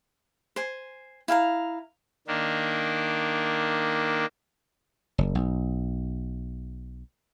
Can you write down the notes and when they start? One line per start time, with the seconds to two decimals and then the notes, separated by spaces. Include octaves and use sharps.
0.56 C5 G#5
1.28 E4 F5 G#5 A#5
2.27 D#3 A#3 D4
5.18 F#1
5.35 B1